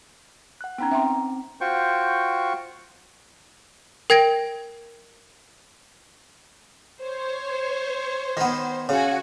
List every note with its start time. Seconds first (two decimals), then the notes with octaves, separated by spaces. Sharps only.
0.61 F#5 F#6
0.78 B3 C#4 D#4 G5 A#5
0.91 C4 E5 G5 C6
1.61 F4 F#4 C5 G5 C#6
4.10 A#4 G5 G#6 A#6 D7
7.00 C5 C#5
8.37 D#3 B3
8.89 C#3 F#4 F#5 G#5